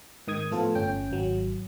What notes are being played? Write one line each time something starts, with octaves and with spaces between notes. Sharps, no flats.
G#2 D#3 D#6 G#6
A2 F3 B3 F4 A4
G1 C#4 G5
G#1 F#3